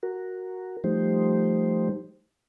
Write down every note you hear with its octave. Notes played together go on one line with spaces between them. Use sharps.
F#4 A#4
F3 G3 A3 D#4 G4 C5